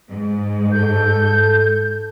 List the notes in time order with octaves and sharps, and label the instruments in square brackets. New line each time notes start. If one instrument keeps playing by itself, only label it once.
[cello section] G#2
[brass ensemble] A4 [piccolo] G6